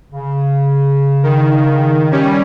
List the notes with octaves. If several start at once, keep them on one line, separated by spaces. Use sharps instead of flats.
C#3
D#3
G3 C#4